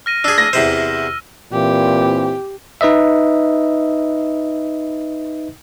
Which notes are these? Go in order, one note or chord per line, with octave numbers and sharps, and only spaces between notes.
F6 A#6 D#7
D4 G#4 E6
A#6
E2 C3 C5
A#2 E3 C4 G4
D#4 B4 D#5 E5